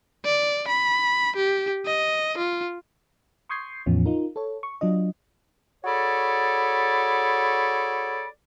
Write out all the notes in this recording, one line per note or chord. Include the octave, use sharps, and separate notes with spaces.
D5
B5
G4
D#5
F4
C6 C#6 D#6 G6 G#6 C7
E2 A2 F3 B3 C#4
D#4 F4 A#4
A4 C#5
C#6
F#3 D4 F4 D#5
F#4 G#4 A4 C#5 D5 B5